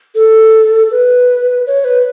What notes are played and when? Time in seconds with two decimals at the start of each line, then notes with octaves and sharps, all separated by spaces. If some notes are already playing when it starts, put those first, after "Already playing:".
0.15 A4
0.91 B4
1.66 C#5
1.84 B4